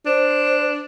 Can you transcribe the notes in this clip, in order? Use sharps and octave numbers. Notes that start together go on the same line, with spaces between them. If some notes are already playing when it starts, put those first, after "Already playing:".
D4 C5